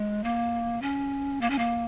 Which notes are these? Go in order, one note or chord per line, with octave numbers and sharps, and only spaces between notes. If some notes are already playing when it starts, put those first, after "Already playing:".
Already playing: G#3
A#3
C#4
A#3
C#4
A#3